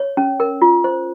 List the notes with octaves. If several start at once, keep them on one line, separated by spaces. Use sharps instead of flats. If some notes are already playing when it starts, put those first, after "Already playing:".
Already playing: C#5
C#4
A#4
F4
C5